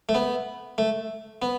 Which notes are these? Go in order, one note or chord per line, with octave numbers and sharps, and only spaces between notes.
A3
B3
A3
B3